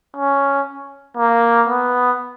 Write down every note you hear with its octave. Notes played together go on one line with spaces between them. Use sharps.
C#4
A#3
B3